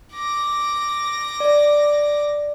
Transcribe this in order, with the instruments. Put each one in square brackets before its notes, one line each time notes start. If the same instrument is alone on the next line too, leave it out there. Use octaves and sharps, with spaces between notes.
[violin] D6 A#6
[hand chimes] D5